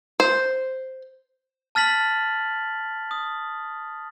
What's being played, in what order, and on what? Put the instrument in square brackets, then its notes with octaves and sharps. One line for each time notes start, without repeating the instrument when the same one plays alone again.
[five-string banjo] C5
[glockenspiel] A5 F6 A6 B6 F#7
D#6